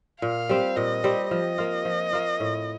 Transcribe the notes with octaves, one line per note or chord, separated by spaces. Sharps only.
A#2 F5
G3 C4 G4
A#2 D#5
G3 C4 G4
F3 D#5
A#3 F4
F3
A#3 F4
A2